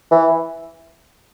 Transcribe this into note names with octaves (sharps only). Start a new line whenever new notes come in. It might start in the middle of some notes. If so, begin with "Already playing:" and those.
E3